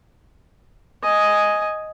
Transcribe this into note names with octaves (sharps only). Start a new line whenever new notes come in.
D#5 G#5